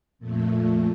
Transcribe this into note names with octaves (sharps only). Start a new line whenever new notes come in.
F2 A#2 A3